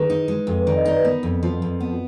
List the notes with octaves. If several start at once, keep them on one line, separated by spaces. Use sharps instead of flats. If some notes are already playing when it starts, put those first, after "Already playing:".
Already playing: D#3 G#4 A#4 B4
D#4
G#3
F2
B4
D#3 D5
D#5
D#4 D5
B4
B3 A#4
F2
F3
F2
B3